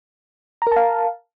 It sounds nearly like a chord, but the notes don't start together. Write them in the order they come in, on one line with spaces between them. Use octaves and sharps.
A#5 A#4 A5 F5